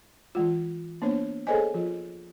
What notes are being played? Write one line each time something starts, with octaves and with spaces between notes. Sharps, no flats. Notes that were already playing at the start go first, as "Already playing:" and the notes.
E3 G#3 F4
A#3 B3 D4 C5 C#5
G#4 A4 C5 C#5 D#5 G#5
F3 F4